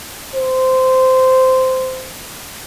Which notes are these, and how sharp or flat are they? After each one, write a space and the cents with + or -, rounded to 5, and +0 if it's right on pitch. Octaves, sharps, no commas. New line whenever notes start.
C5 -15